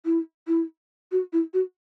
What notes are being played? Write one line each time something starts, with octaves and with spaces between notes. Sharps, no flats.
E4
E4
F#4
E4
F#4